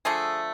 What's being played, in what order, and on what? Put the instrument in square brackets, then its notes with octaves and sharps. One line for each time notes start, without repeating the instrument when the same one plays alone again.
[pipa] D3 F3 A3 G#4